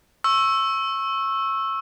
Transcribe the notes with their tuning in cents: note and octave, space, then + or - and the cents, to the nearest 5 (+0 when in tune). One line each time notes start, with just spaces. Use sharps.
C#6 -25 E6 +0